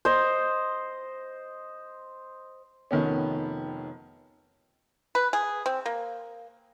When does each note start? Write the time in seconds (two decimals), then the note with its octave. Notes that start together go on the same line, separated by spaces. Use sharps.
0.05 C5 D#5
2.91 F1 D#3 B3 C#4
5.15 B4
5.33 G#4
5.66 C4
5.86 A#3